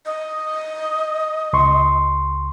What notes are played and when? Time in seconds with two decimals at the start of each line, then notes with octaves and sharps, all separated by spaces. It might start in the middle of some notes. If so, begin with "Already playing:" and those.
0.06 D#5
1.53 C#2 C6 C#6